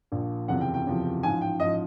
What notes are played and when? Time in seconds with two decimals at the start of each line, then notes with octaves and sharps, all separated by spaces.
0.12 A#1 A#2 F3
0.48 F#1 E2 C3 F3 F#5
0.61 G5
0.74 G5
0.86 F#1 E2 C3 F3
1.23 A1 G#2 F3 G#5
1.41 G5
1.60 A1 G#2 F3 D#5